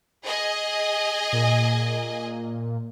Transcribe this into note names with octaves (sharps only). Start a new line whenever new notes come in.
G#4 D#5 G#5
A#2